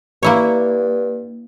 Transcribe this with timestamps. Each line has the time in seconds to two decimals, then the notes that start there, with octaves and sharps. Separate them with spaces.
0.23 G2 A#3 E4 C#5